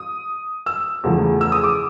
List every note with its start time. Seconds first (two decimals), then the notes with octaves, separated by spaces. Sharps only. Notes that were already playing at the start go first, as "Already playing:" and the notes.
Already playing: D#6
0.66 E6
1.03 E2 C#3 F3 A3
1.41 E6
1.52 D#6
1.64 D6